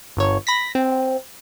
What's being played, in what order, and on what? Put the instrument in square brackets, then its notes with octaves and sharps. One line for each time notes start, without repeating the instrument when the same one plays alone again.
[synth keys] G1 C#5
B5 A#6 B6
C4